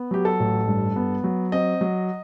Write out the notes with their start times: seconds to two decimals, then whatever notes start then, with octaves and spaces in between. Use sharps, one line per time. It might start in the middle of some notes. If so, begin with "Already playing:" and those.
Already playing: B3
0.11 F#3 G4
0.25 A4
0.40 A1
0.68 G2
0.96 B3
1.24 F#3
1.52 C4 D#5
1.81 F#3